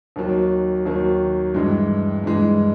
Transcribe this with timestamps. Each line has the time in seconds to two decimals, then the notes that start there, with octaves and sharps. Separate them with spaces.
0.16 D#2 D#3 F#3
0.85 D#2 D#3 F#3
1.55 G2 E3 G#3
2.24 G2 E3 G#3